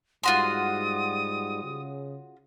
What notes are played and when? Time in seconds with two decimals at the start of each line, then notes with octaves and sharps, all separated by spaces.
0.23 G#2 G3 F4 F#4 C6 D#6
1.63 C#3